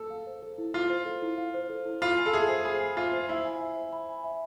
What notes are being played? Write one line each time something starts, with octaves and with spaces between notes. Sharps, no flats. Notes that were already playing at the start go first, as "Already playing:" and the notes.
Already playing: A4
F5
C5
A4
E4
F4 F5
C5
A4
E4
F5
C5
A4
E4
F4 B5
G#5
A4
G#4 E5
C5
G#4 B5
G#5
F4 E5
C5
E4 B5
G#5
E5
C5
B5
G#5
E5